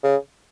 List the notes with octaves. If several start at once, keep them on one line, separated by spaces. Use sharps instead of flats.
C#3